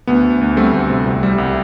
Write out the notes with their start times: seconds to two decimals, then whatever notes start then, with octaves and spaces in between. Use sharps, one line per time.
0.07 D2 B3
0.25 D2
0.41 D2
0.57 G3 A3 C4
0.73 D2
0.90 C3
1.05 C2
1.23 G3
1.38 C2